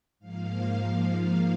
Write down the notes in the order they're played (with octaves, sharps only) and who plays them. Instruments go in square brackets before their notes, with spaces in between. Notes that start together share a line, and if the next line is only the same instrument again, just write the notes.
[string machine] G#2 F3 A#3 F5